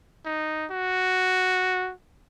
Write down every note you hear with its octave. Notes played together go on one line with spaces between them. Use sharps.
D#4
F#4